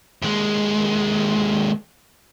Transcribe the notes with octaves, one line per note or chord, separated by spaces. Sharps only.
D#2 G#3